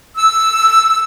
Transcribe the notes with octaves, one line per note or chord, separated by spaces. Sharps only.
E6